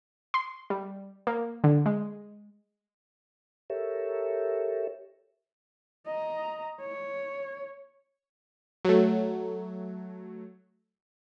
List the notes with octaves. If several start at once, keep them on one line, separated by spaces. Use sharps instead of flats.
C6
G3
A#3
D3
G#3
G4 A4 A#4 C#5 E5
D#5 A#5
C#5
F#3 A3